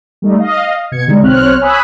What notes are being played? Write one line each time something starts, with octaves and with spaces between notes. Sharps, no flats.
G3 A3 D#4
D#5 F5
B2 G#6 C#7
D3 G3 G#3 D#4
B1 C4 C#5 F6 F#6
C#5 G#5 B5 D#6 E6 F#6